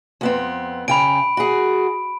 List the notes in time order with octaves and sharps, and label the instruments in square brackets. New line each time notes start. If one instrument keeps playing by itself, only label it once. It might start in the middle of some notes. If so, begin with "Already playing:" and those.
[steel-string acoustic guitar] F2 B3 C4
[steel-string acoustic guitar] C#3 G5 [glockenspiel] B5 D7
[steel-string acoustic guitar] F#4 G#4